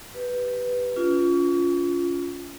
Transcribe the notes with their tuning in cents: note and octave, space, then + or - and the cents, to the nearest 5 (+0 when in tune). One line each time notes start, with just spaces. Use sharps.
G4 +0 B4 +0
C#4 +35 F4 +0